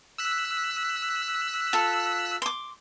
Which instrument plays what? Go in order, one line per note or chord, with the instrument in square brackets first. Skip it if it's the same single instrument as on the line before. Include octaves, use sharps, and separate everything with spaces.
[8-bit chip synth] E6 F#6 B6
[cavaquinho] F4 A4
C6 D6